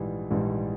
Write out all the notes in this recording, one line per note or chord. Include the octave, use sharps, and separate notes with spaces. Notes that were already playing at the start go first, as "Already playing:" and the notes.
Already playing: A#1 G#2 E3 G3
A#1 G#2 E3 G3